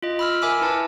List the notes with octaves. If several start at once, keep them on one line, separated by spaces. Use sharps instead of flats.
F4 D#5
B5 E6 F6
A#4 E5 G#5 D6 E6 F6
E4 B4 A5